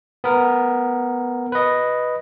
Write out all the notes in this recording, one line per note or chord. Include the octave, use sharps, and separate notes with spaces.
B3 A#4
B4 D#5